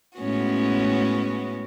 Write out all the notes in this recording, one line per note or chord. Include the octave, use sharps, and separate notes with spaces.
A2 G#3 B3 C#4 F#4